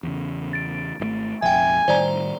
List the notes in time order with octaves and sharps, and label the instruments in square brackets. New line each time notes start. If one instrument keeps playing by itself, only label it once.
[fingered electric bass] E2 C#3
[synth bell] A6 D7
[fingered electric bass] G#1 D3 A3
[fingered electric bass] F1 A#1 F2 [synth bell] E5 G5 [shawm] G#5
[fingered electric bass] A2 D#3 G3 [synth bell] C5 D5 A#5